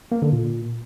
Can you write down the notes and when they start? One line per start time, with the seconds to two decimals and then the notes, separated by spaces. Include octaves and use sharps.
0.12 A#3
0.22 D3
0.33 A#2